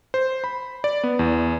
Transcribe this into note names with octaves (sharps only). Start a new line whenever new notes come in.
C5
B5
D5
B3
E2